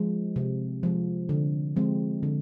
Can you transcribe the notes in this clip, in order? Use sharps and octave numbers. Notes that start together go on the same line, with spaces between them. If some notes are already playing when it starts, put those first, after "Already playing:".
Already playing: F3 G#3
C3
F3 G#3
D3
F3 G#3 C4
D3